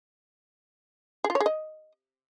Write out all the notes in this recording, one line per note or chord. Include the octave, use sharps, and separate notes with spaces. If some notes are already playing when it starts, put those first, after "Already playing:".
G#4
F4
C#5
G#4
D#5